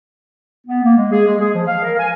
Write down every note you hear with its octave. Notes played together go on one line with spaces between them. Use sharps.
B3
A#3
G#3
G#4
G#3
G#4
F3
F5
A#4
G#5